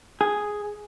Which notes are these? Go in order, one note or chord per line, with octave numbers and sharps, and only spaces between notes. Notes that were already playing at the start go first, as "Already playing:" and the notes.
G#4